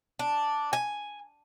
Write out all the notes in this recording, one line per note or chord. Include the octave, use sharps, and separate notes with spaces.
D4
G#5